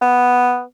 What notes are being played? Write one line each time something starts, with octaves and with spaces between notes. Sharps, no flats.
B3